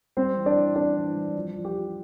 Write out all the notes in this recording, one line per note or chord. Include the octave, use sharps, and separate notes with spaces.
G3 C4 C5
E3
D4 D5
E3
C4 D4 D5
E3
G3
F3
F3
G4
F4